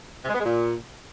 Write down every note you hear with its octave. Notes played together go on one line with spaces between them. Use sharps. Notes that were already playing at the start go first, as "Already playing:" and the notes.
C3
G#3
B3
G#3
A#2